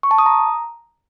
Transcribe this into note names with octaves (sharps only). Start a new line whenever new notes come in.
C#6
A5
D#6
A#5